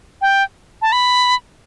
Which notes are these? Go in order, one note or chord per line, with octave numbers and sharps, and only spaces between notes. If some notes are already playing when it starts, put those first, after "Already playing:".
G5
A5
B5